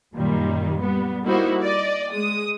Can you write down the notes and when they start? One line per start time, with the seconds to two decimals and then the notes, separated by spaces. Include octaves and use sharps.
0.14 F#2 A#2 D#3 G3
0.80 G3 B3
1.25 G3 A#3 D#4 E4 F#4 C5
1.61 D5 D#5
2.11 G#3 D#6